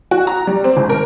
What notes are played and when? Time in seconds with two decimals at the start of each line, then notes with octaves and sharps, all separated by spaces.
0.11 F#4
0.27 A#5
0.47 G3
0.64 C4
0.77 G#1
0.90 A#4